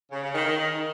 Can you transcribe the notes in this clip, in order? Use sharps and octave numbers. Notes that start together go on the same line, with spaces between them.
C#3
C#3
D#3
D#3